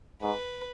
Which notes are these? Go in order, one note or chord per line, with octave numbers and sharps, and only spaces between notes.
G#2 B4